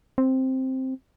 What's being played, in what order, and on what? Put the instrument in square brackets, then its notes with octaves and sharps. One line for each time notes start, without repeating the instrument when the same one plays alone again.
[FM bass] C4